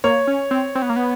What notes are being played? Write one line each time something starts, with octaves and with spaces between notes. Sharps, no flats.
A#3 C#5
C#4
C4
C4
B3
A#3
B3